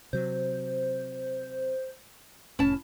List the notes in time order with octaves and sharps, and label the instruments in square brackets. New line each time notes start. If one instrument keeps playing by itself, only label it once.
[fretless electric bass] C3 F#3 [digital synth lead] C5
[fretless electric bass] F1 A2 [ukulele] C#4 A5 [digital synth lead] E4